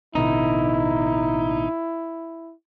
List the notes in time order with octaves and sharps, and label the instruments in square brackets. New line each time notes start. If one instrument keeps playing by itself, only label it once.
[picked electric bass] A1 B2 D3 [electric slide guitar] D#4 [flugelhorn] E4